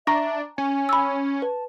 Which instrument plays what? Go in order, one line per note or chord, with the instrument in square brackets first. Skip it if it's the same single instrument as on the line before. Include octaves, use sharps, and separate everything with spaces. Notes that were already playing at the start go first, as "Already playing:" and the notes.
[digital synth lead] D4 [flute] E5 [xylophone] A#5 C#6 A#6
[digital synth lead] C#4 [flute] G#5
[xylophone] B5 E6
[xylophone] B4 [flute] A5